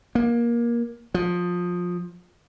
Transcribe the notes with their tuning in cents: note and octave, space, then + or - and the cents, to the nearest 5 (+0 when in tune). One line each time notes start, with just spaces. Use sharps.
A#3 +20
F3 +20